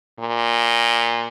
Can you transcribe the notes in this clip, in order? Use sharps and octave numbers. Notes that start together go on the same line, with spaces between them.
A#2